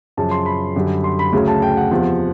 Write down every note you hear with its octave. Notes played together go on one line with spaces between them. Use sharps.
F#2 C#3 F3 A5
C6
B5
F#2 D3 G3
C6
B5
D2 C#3 F#3
A5
G5
F#5
E2 C3 F3